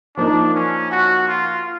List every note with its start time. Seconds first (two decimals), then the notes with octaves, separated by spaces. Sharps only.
0.17 F3 A#3 D4 D#4
0.54 C#4
0.91 F#4
1.28 F4